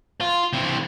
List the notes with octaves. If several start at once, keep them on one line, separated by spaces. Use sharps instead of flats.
F4
C3 E3